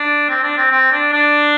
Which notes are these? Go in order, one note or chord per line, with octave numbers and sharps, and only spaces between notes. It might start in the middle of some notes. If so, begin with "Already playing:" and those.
Already playing: D4
C4
D4
C4
C4
D4
D4